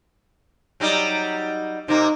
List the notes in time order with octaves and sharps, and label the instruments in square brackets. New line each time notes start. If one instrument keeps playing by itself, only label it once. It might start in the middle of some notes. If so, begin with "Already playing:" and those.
[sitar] F#3 G3 D#4
[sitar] C3 A#3 [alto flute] D#4